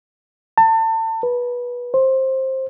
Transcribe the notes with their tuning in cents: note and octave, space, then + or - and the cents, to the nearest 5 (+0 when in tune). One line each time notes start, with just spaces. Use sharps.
A5 +30
B4 -20
C5 +15